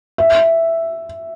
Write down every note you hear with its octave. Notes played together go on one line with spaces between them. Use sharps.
E5